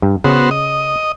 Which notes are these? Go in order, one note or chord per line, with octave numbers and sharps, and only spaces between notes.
G2
C#3 B3 F#4 C5
D#5